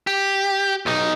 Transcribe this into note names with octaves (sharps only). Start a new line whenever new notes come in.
G4
B1 D#4